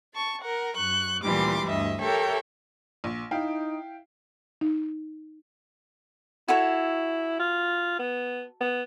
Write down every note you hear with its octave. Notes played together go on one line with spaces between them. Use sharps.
A5 C#6
A#4 F#5
F#2 C#6 F#6
D2 A#2 E3 G3 C6 D6
D2 G2 D#5 E5
G4 A4 A#4 C#5 E5 G5
A#1
D#4 E4 F5 G5
D#4
E4 F#4 A4 C#5
F4
B3
B3